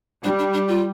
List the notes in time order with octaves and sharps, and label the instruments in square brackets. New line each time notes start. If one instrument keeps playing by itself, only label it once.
[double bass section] G3 [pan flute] D4
[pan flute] D4
D4
F4